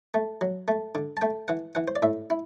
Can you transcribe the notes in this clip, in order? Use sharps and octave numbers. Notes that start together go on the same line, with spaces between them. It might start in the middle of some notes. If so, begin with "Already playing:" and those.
A3
F#3
A3
D3
A5
A3 G5
E3 F#5
E3 F#5
C5
D5
A2 E5
E4